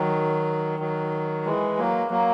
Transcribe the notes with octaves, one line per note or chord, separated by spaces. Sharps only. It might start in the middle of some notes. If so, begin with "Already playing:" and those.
Already playing: D#3 F#3
D#3 F#3
E3 G#3
F#3 A#3
F#3 A#3